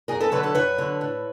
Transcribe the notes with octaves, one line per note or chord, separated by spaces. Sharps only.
F#2 G#4 A#4
A4 B4
D3 F#3 A4 B4
A4 B4
F#2 B4 C#5
D3 F#3
A2